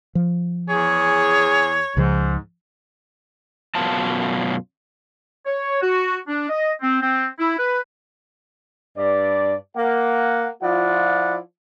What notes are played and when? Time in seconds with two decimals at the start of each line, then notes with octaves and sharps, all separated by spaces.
0.15 F3
0.69 E2 G#4 C#5
1.97 C#2 G#2 C#3 F3
3.75 F#2 B2 F4 A5
5.45 C#5
5.82 F#4
6.28 D4
6.49 D#5
6.81 C4
7.01 C4
7.39 E4
7.58 B4
8.97 G2 D5
9.77 A#3 F#5
10.63 F3 E4 F4 D5 F#5